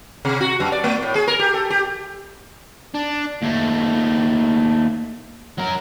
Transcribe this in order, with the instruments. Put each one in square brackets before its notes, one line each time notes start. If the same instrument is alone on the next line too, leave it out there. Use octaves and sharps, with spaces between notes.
[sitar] C3
F#4
F#2
D5
A3
A2
G#4
A#4
G4
A4
G4
[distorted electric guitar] D4
D#2 A3
F#3 A#4